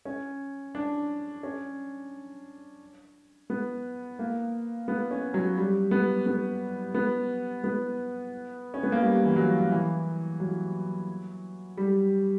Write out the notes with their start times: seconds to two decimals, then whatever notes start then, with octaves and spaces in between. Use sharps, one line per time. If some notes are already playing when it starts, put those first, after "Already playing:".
0.05 C#4
0.75 D4
1.43 C#4
3.50 B3
4.19 A#3
4.88 B3
5.11 C#4
5.34 F#3
5.57 G3
5.91 B3
6.26 B3
6.94 B3
7.64 B3
8.74 C#4
8.83 B3
8.92 A#3
9.02 G3
9.25 E3
9.36 F#3
9.71 E3
10.40 F#3
11.77 G3